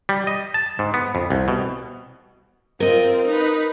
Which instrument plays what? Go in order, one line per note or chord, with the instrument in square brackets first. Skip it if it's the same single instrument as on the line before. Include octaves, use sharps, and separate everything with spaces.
[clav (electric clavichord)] G3
D#5
A5
G#2
B3
F2
C2
B2
[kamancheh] C4 F4 [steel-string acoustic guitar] A#4 D#5
[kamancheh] D#4 B4